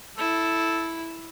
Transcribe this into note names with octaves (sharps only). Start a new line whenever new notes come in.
E4 A4